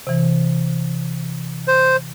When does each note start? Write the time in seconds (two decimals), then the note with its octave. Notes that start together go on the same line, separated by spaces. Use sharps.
0.07 C3 E3
1.68 C5